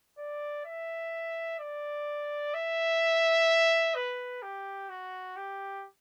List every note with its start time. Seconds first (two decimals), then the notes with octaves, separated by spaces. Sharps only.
0.18 D5
0.65 E5
1.59 D5
2.54 E5
3.95 B4
4.42 G4
4.89 F#4
5.36 G4